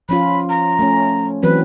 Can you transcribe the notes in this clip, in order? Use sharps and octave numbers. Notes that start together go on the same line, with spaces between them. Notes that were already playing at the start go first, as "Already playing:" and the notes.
F3 C#4 F4 B5
A#5
A3 C#4
E3 F#3 C4 B4